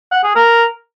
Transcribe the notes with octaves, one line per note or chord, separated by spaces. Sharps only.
F#5
G#4
A#4